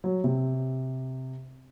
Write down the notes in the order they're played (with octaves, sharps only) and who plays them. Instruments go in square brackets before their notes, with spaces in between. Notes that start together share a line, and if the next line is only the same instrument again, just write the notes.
[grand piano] F#3
C3